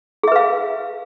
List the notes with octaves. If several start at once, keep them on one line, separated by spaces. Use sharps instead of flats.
G#4 B4 E5 F5